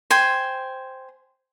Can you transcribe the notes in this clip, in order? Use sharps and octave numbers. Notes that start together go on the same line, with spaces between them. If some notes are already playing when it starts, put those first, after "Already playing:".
C5 G5 G#5